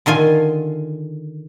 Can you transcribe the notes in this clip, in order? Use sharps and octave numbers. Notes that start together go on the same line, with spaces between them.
D3 D#3 F4 G#5